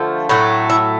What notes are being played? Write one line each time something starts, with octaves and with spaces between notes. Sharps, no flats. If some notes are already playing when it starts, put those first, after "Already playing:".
Already playing: D3 F3 A3
A2 F#3 A3
E4